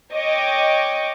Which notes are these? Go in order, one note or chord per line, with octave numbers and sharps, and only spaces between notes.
C#5 D#5 G5 C#6 D6